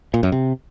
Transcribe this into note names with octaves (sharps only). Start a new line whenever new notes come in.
A#2
F#2
C3